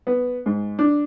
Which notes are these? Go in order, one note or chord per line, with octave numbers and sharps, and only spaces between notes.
B3
G#2
D4